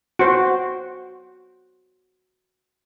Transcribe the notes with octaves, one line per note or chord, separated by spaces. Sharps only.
F#4 C5